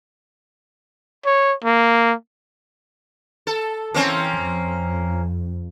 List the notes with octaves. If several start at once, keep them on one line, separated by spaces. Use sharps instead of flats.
C#5
A#3
A4
E3 A#3 C4 C#4
F2